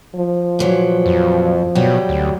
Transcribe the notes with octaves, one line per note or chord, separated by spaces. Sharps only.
F3
A#2 E3 F#3
F2
B2 F#3 G3 G4
D2